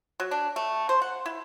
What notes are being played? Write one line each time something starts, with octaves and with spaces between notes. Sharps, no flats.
F#3
D4
A3
C5
F#5
E4